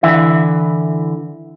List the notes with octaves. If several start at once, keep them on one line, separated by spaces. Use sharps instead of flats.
D3 E3 E4 E5